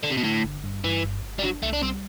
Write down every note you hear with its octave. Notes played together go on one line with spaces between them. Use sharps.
D3
C3
B2
A2 D3
G1
G2
G2 E3
G1
G1
G3
F#3 D4
C2 A3
D4
G3 C4